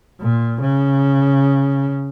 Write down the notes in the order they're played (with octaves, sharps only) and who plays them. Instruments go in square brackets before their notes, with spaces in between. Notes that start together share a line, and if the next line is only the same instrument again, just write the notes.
[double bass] A#2
C#3